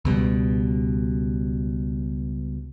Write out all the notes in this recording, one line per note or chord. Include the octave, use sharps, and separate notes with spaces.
C#2 B2 G3